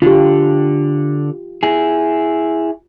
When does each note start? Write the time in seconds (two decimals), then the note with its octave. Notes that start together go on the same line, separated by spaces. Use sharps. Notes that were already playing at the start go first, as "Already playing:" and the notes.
0.02 D3 F4 G4
1.63 E4 G#4